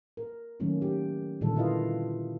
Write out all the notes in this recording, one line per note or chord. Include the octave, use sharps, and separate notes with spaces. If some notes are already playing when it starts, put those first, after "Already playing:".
A#4
D#3 F#3 A3 A#3 C#4
G4
A#2 D3 D#3 G3 D4 A4
E4 F4 B4 D#5 F5